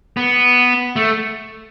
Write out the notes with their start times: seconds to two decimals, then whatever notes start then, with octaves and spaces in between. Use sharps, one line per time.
0.17 B3
0.96 A3